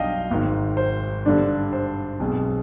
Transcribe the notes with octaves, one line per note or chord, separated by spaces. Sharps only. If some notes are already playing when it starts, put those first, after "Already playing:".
Already playing: B1 B2 G3 D4 D#5 F5 G5
G#1 G#2 D#3
C5
G2 D3 G3 D4
C5
B1 B2 G#3 C4